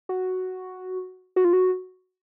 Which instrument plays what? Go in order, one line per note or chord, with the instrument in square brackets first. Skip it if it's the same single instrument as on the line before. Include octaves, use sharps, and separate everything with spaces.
[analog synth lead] F#4
F#4
F4
F#4